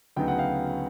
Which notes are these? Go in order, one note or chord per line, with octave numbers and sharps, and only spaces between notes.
D2 C#3 F#3 B3 D#4 G5
F#5
F5 G5